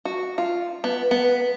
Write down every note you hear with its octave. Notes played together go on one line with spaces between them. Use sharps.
F#4
F4
B3
B3